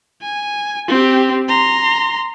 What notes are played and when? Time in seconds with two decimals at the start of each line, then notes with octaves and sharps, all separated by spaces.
0.22 G#5
0.88 C4 G4
1.49 A#5 C6